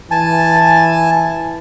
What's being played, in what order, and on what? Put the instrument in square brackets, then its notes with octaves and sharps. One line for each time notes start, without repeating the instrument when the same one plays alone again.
[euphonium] E3 [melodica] G#5 A5